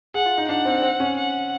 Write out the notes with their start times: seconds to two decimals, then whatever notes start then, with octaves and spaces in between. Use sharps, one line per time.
0.14 G#4 F#5
0.26 F4
0.38 D#4
0.49 D4 F#5
0.65 C4
0.82 C4
1.00 C#4
1.17 F#5